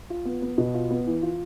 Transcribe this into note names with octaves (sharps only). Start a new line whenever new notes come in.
F4
B3
B3
B2
F4
B3
E3
F4